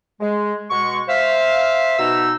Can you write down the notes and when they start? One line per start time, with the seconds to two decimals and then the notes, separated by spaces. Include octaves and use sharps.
0.21 G#3
0.70 B2 G#3 C#6
1.08 C5 E5 F5
1.99 B2 D#4 E6